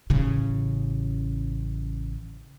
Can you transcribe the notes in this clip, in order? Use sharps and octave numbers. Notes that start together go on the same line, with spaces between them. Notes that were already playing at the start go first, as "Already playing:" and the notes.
A1 C#3